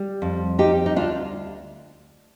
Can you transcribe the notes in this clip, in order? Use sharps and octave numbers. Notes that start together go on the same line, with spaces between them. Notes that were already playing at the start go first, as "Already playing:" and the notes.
Already playing: G3
F2
G3 D#4 G4
D#4
D2 D4 F4